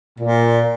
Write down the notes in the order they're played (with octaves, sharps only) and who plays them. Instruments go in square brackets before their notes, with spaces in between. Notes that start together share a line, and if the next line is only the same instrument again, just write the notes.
[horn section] A#2